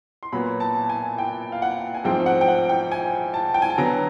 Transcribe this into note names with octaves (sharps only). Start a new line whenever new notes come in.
C6
A#2 F#3 B3 B5
A5
G#5
G5
F5
F#5
G#5
G#2 F3 A3 C4 G5
F#5
G5
F#5
G5
G#5
A5
G5
G#5
A5
D3 F#3 B3 A#5